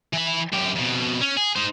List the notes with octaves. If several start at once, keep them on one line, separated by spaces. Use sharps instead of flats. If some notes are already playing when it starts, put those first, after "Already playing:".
E3 B5
F#2 G4
F2 B2
C#4
G#4
D#4 C5